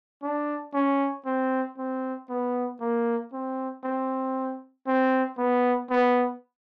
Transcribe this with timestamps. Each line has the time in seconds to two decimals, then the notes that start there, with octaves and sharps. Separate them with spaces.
0.23 D4
0.74 C#4
1.26 C4
1.78 C4
2.29 B3
2.81 A#3
3.33 C4
3.84 C4
4.87 C4
5.38 B3
5.90 B3